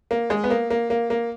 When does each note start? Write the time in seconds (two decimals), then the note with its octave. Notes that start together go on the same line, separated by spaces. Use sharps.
0.11 A#3
0.30 G#3
0.44 B3
0.50 A#3
0.70 A#3
0.90 A#3
1.10 A#3